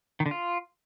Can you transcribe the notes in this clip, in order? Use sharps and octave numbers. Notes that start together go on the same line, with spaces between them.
D#3
D3
F4